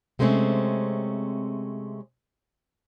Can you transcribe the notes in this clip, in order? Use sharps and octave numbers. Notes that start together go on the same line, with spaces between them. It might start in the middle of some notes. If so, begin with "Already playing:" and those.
C3 G#3 A3 C4 C#4